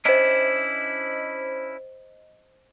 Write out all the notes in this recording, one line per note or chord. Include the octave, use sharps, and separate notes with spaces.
C#4 D4 E4 C5 D#5